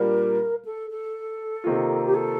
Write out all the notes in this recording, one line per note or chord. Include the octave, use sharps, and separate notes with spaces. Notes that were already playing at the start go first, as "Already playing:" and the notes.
Already playing: A#2 G3 D4 A#4
A4
A4
C3 D#3 A#3 F4
G4
A4